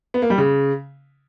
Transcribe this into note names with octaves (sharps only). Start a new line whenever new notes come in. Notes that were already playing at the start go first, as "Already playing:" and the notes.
B3
A#3
G3
C#3